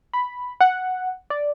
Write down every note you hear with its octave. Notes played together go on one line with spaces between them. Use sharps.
B5
F#5
D5